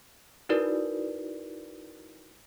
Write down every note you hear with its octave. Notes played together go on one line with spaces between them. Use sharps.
D#4 E4 F#4 A#4 B4 D5